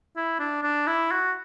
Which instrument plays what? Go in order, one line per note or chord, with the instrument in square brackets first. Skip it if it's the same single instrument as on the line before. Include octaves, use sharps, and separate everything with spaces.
[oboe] E4
D4
D4
E4
F#4